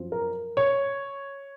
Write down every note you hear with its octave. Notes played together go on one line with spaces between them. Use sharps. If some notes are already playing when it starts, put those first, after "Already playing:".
Already playing: F#2 F3 C4
A#4
C#5